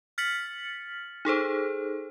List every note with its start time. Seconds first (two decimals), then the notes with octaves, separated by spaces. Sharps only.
0.18 F6 A6 B6 C#7 F#7
1.25 D#4 G#4 A4 C5